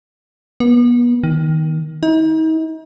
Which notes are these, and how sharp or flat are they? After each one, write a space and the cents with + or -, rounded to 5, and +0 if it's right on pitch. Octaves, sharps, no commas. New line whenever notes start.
B3 -35
D#3 +15
D#4 +40